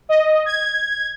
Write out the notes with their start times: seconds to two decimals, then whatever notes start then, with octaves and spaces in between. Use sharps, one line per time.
0.09 D#5
0.46 G#6